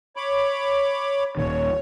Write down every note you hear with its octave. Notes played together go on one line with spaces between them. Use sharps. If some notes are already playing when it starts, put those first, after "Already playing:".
C#5 B5 D6
D#1 A#2 D#3 C#5